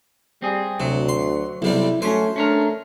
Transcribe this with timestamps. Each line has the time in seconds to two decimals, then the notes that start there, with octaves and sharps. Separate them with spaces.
0.42 G3 C4 G#4
0.80 D2 C3 F#3
1.09 C6
1.62 B1 C3 G3 E4
2.02 F#3 A3 C#4 C5
2.36 A3 C#4 D4 A#4